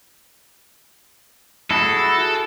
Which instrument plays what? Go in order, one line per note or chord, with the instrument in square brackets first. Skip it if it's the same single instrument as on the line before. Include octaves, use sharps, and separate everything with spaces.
[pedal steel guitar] E4 F#4 G#4 [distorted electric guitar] A4